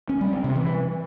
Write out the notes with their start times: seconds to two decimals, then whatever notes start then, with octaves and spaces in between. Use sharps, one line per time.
0.09 C#4
0.21 G3
0.32 C4
0.44 C3
0.56 E3